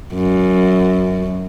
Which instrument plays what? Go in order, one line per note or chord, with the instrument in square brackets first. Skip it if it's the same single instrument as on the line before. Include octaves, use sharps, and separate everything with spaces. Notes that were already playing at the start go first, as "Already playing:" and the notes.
[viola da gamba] F#2